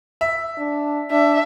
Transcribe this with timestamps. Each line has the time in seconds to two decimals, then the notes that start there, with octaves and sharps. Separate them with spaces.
0.21 E5
0.58 D4
1.11 D4 E5